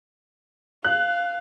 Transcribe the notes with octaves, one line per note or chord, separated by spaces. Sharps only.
F5 F#6